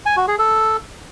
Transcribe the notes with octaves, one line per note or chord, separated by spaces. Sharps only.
G#5
F#4
G#4
A4